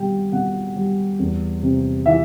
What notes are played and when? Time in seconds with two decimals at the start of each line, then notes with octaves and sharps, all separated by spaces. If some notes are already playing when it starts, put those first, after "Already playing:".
Already playing: B2 G3 G5
0.32 B2 F#5
0.76 G3
1.19 E2
1.62 C3
2.06 E3 E5